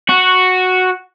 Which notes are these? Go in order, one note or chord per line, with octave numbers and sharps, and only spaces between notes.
F#4